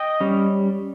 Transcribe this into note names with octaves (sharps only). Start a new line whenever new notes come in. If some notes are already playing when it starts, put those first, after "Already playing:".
Already playing: D#5 G5
G3 C#4